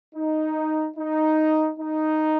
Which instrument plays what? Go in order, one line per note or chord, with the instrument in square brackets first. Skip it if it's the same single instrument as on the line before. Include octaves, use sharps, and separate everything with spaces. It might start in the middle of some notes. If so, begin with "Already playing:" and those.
[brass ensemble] D#4
D#4
D#4